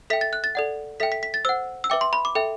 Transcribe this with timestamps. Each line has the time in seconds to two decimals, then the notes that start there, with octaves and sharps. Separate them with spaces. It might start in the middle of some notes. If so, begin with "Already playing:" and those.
0.10 A4 E5 G5 B6
0.21 A6
0.33 F#6
0.44 A6
0.55 A4 D5 F#5
1.00 A4 E5 G5 B6
1.12 B6
1.23 B6
1.34 A6
1.45 C5 F#5 E6
1.84 E6
1.90 B4 E5 G5 D6
2.01 C6
2.13 B5
2.25 D6
2.35 A4 E5 G5